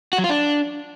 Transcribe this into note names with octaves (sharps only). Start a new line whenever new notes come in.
F#4
F#3
F4
D4